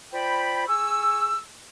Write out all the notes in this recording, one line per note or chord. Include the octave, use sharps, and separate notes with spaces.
F4 C5 D5 G5 B5
G#4 G#5 C#6 E6